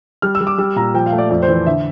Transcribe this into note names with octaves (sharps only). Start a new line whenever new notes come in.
G3 F6
E6
G3
D6
G3 E6
A#2 A#5
F3 G5
F5
A3
D5
F2 D5
C5
E3
C5
D3 E5